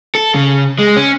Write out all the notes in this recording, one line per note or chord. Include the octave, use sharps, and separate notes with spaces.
A4
C#3
G#3
C#4